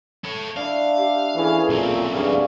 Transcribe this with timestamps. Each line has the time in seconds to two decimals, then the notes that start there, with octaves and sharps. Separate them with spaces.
0.24 A4 C#5
0.57 D4 E4 F5
0.97 G4
1.36 E3 C#4 G#4 A4
1.69 B1 A#2 C4
2.14 G2 G3 F#4 G#4 F5